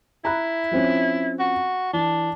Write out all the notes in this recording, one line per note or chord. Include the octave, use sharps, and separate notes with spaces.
E4 A#5 B5 F#6
F3 C4 C#4
F#4
E3 D4